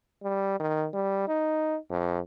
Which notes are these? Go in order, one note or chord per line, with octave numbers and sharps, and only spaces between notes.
G3
D#3
G3
D#4
F2